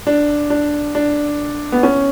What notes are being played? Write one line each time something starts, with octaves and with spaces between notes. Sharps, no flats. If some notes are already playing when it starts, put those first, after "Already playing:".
D4
D4
D4
B3
C#4